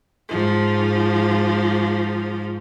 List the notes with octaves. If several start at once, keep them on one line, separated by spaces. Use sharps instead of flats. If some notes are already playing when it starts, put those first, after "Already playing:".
G#2 F3